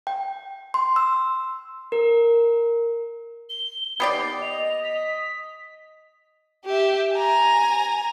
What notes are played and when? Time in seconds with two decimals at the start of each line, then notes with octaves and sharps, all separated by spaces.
0.07 G5
0.74 C6
0.96 E6
1.92 A#4
3.49 G7
4.00 D#2 B3 G4 D5 C7
4.42 D#5 F7
4.83 B6
6.65 G4 E5
7.13 G#5 A#5